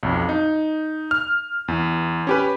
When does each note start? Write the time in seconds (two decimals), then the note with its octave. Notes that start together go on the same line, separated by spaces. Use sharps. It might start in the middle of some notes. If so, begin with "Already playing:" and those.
0.03 B1 F2
0.29 D#4
1.11 F6
1.68 E2
2.27 C#4 G4 B4